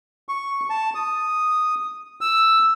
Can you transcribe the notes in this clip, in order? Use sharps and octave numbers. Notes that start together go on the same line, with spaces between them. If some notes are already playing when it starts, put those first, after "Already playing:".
C#6
A5
D#6
E6